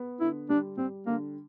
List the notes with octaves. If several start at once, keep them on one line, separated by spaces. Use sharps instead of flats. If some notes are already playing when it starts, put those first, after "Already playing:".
Already playing: B3
D3 E4
G3 D4
G3 C4
D3 A#3